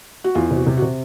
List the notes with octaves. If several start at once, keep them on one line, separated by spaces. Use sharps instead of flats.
F#4
E2 F4
C3
F#4
C3
F#4
C3